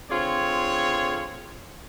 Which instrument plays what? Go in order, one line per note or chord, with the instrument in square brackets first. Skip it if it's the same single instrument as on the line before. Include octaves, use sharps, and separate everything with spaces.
[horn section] D3 C4 F4 G#4 C#5